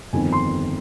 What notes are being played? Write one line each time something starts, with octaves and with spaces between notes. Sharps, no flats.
G1 F2 D#3 G#5
C6